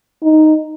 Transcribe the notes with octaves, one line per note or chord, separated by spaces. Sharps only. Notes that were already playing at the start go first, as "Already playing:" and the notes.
D#4